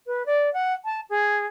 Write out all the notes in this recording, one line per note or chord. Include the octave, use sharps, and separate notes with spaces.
B4
D5
F#5
A5
G#4